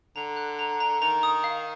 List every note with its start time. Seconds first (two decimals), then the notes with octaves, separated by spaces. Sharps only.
0.16 D3 A#5
0.36 F#6
0.59 A#5
0.80 A#5
1.01 D#3 A#5
1.23 D#6
1.44 F5